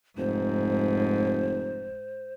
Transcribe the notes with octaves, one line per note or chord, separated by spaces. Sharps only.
F1 G#2 C5